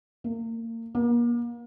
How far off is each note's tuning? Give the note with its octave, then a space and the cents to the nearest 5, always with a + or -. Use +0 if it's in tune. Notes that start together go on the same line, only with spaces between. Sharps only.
A#3 -35
A#3 +35